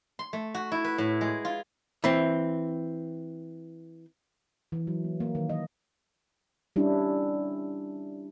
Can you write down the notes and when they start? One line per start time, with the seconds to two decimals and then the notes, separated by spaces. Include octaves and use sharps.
0.19 C6
0.33 A3
0.54 F#4
0.72 E4
0.84 B4
0.98 A2
1.21 G#3
1.45 F4
2.04 E3 C4
4.72 E3
4.87 F#3
5.04 A#3
5.20 A#3
5.35 D#3
5.49 D#5
6.76 G3 C#4 D4 E4